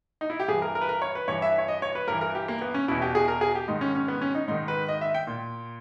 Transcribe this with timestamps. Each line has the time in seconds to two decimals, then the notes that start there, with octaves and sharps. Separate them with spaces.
0.21 D#4
0.30 E4
0.40 G4
0.48 G2 E3 G#4
0.62 A#4
0.75 A#4
0.81 B4
0.89 A#4
1.02 C#5
1.15 B4
1.28 G2 E3 C#5
1.42 E5
1.58 C#5
1.68 D#5
1.82 C#5
1.95 B4
2.08 G2 E3 A#4
2.21 A#4
2.35 G4
2.48 A#3
2.62 B3
2.74 C#4
2.88 E2 B2 E4
3.02 G4
3.15 G#4
3.28 A#4
3.41 G#4
3.55 G4
3.68 G#2 D#3 D#4
3.81 C#4
3.95 C#4
4.08 B3
4.22 C#4
4.35 D#4
4.48 G#2 D#3 D#4
4.68 B4
4.88 D#5
5.01 E5
5.15 G5
5.27 A#2